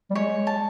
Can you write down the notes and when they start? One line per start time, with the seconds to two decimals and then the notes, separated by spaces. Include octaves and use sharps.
0.10 G3
0.15 G#3 C#5
0.47 A5